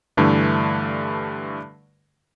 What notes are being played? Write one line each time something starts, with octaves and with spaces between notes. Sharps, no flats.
G2 D3 E3 A3